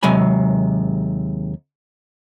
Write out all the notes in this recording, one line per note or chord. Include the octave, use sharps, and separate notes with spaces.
D#2 C3 F#3 G#3 G#5 B5